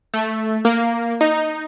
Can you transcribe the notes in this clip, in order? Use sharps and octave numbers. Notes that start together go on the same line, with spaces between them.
A3
A#3
D#4